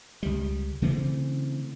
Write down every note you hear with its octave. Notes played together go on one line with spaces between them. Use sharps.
C#2 G3
C#3 E3 A3 C4